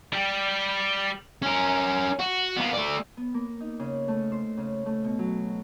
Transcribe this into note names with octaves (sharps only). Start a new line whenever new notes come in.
G3 G4
C#4 A#4
F#4
A#3 B3
A3 D5
B3
A#3
D#4
C#3
A3
C5
C#3
A3
B2
F#3